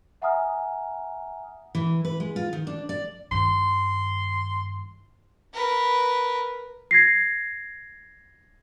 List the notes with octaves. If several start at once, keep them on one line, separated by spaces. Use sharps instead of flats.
E5 F#5 G#5 A#5 D#6 F6
E3
B4
G#3
F4
D#3
D4
D5
G2 D#3 C6
A#4 B4
G#6 A#6 C7